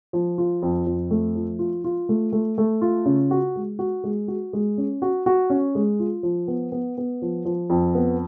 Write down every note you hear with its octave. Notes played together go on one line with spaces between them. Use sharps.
F3
F4
F2
F2
A3
F3
F4
F4
A3
A3
A3
F4
C#3
F#4
G#3
F#4
G#3
F#4
G#3
C#4
F#4
F#4
C#4
G#3
F4
F3
B3
B3
B3
F3
F3
F2
B3